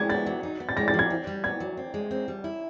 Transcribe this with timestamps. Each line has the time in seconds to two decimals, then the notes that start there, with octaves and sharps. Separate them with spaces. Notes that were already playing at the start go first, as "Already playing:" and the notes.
Already playing: G#3 G#6
0.09 B3 A6
0.26 F#3
0.43 D#4
0.60 B3
0.69 A6
0.77 G#3 A#6
0.88 A6
0.94 F3
0.99 G#6
1.10 C4
1.27 G3
1.44 B3 G#6
1.60 F#3
1.77 C4
1.94 G#3
2.11 C4
2.28 G3
2.44 E4